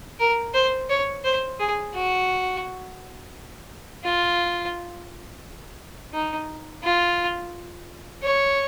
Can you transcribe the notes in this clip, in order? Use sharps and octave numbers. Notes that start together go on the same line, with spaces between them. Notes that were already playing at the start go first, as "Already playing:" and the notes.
A#4
C5
C#5
C5
G#4
F#4
F4
D#4
F4
C#5